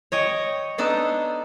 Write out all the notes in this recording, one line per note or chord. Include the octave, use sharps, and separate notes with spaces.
C#5 D#5 G5
B3 D4 D#4 A4